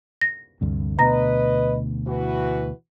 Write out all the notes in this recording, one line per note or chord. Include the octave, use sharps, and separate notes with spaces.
A#6
D2 G2 C3
D2 B2 B3 B4 D#5 A#5 A#6
E3 F#4 B4